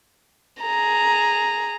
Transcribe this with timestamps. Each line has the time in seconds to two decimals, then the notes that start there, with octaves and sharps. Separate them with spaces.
0.62 G#4 A#5